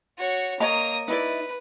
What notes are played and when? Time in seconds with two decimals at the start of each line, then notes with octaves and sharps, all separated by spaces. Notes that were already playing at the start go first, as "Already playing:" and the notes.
0.18 F#4 C#5
0.60 A#3 C#5 D#5 A#5 D#6
1.08 D#4 E4 B4 D5